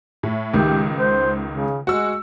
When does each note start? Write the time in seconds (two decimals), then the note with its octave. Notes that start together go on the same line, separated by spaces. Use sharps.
0.23 A2
0.54 C#2 D#3 G4
0.99 C5
1.49 C#3
1.87 G#3 F#4 E6